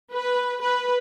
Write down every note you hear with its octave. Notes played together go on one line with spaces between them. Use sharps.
B4
B4